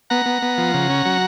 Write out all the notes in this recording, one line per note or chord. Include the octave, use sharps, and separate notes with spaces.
B3 F#5 A#5
B3
B3
F3
C#3
C#4
F#3